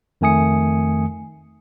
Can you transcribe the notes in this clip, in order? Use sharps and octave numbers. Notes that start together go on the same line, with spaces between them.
F2 D#3 A3 G#5 D#6 C#7